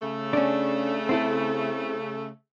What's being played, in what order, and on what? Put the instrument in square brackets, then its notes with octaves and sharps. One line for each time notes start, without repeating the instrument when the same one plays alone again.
[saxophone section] C#3 A3
[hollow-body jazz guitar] C#4 D4
C4 E4 A4